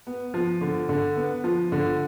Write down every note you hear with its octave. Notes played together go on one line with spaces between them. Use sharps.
B3
F3
D3
D3
B3
F3
D3